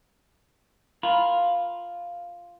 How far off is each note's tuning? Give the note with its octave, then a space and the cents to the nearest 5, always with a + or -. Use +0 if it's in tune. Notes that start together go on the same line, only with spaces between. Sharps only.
F4 +0 A#4 +0 B5 +0